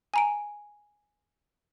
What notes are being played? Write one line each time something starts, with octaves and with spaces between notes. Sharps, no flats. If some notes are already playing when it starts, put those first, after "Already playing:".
G#5 A#5 D7